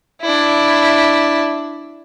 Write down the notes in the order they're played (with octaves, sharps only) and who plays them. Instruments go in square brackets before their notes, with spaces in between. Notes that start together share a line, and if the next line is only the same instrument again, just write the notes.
[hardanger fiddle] D4 E4